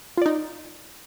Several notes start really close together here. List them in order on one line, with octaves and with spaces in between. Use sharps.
F4 D5 D#4